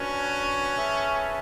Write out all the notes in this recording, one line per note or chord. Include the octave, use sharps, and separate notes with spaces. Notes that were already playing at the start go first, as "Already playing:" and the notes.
Already playing: C#4 D4 F#4 B4 F#5
G#4 B4 E5 A5